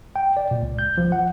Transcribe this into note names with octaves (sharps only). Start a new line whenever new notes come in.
G5
D5
A#2
C#2
G6
F3
F#5